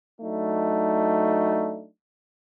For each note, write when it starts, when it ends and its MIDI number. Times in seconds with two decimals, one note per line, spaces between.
0.20 1.87 54
0.20 1.87 57
0.20 1.87 62
0.20 1.87 63